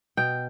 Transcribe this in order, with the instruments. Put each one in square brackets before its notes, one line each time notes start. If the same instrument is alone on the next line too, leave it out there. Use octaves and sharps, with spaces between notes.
[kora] B2 G5